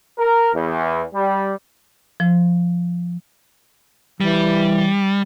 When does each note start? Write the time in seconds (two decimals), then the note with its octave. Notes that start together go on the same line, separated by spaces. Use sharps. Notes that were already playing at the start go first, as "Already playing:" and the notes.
0.19 A#4
0.54 E2
1.14 G3
2.20 F3
4.21 E3 G3